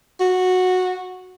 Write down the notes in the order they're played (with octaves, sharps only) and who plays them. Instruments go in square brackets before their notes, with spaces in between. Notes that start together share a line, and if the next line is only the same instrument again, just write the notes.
[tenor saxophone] F#4